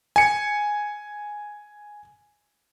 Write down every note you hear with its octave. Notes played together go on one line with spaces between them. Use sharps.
G#5 C#7